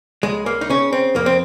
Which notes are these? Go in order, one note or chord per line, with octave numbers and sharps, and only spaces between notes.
C#2 G#3
A#3
D#4
C#3 C#4
C4
F2 A#3
C4